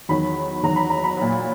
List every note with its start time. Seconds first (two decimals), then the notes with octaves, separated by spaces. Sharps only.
0.09 E2 D#3 F#3 B5
0.63 E2 D#3 F#3 A#5
0.76 B5
0.90 A#5
1.04 B5
1.17 A#2 F#3